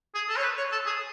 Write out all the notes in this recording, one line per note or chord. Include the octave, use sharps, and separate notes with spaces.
G#4
A4
C#5
B4
C#5
A4
G#4